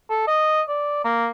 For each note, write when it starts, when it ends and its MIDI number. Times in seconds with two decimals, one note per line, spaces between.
0.10 0.25 69
0.28 0.61 75
0.69 1.02 74
1.04 1.28 58